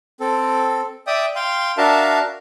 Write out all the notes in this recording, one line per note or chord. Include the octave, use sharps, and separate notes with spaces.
C4 A4
D5 E5 G5 D#6
F5 G5 C6
D4 F#4 A#4 E5 F5 A5